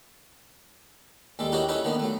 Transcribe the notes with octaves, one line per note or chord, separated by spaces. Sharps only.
D#2 G3 G#3 A4
D#4 E4 F#4 G4 A#4 C#5
C#4 D#4 E4 A4 B4 C#5
D3 D#3 A#3 B3
F#3 A3